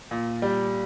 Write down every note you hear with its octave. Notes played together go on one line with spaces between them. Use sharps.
A#2
G3